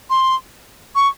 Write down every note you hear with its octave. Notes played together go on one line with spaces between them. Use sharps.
C6
C#6